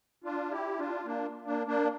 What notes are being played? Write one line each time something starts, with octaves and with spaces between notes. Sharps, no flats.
D4 F4
E4 G4
D4 F4
A#3 D4
A#3 D4
A#3 D4